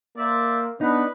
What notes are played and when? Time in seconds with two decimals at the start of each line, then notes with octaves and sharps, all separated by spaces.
0.17 A#3 C5 D5 E5
0.81 B3 D4 D#4 B4